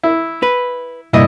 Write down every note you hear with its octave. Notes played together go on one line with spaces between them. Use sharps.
E4
B4
C2 G2 A#2 E4 D5 D#5